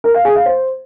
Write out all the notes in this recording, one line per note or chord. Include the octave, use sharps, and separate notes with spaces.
A#4
F5
G#4
F5
C5